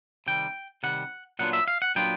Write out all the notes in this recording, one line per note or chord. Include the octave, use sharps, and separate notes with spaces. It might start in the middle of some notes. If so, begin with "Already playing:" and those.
C3 D#3 G3 G5
C3 D#3 G3 F#5
A#2 F#3 B3 D4 F4 F#5
E5
F5
F#5
A#2 F#3 B3 D4 F4 G5